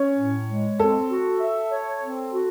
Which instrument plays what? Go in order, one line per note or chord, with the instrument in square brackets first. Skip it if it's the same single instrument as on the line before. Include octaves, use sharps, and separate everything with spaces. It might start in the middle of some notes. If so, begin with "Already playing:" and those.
Already playing: [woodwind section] C#4 [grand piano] C#5
[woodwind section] A2
G#3
[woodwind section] C4 [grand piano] A4
[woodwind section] F#4
E5
C#5
C4
F#4